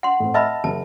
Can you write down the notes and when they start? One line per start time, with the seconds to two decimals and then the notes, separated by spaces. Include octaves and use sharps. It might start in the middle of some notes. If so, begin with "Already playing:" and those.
0.03 F#5 C6
0.20 A2 C4
0.34 D#5 E5 A5 B5 E6 F6
0.64 F#1 A5